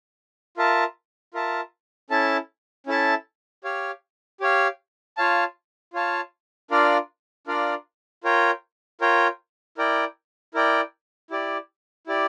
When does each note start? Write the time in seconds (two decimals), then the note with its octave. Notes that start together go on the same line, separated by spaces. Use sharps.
0.57 F4 A#4 E5 A5
1.34 F4 A#4 E5 A5
2.10 C#4 E4 A4 E5 A5
2.87 C#4 E4 A4 E5 A5
3.64 G4 C#5 F5
4.41 G4 C#5 F5
5.17 F4 C#5 F5 A5
5.93 F4 C#5 F5 A5
6.71 D4 F4 A#4 D5 F5
7.47 D4 F4 A#4 D5 F5
8.24 F4 A#4 C#5 G5
9.01 F4 A#4 C#5 G5
9.78 E4 A#4 D5 G5
10.54 E4 A#4 D5 G5
11.30 E4 G4 D5
12.07 E4 G4 D5